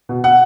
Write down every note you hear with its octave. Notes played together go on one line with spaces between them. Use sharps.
B2
F#5